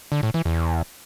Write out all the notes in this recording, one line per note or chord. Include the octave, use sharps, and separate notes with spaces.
D3
A2
E3
E2